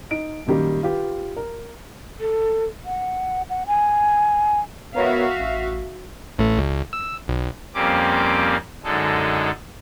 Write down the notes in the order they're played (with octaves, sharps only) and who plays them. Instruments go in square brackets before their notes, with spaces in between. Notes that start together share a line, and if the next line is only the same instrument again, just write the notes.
[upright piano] D#4 D7
F#2 A#2 D#3 G3 A#3
F4 G4 B4
A#4
[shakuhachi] A4
F#5
F#5
G#5
[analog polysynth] B3 A#4 C#5 [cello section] F#4 E5 F5
[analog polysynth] A1
[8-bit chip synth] A1 A2 A3
C#2
E6
B1
[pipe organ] F2 G3 A#3 C4 C#4 D6
F#2 D3 G#3 D#4 A4